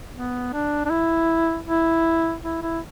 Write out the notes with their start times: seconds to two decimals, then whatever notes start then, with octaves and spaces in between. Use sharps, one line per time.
0.15 B3
0.53 D4
0.86 D4
0.90 E4
1.66 E4
2.43 E4
2.62 E4